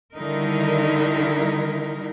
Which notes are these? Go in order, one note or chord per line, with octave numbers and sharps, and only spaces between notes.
D3 D#3 G3 D#4 E4 A#4